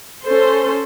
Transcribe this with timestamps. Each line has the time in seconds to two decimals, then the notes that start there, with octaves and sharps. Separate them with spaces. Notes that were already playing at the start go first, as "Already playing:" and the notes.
0.24 C#4 A4 C5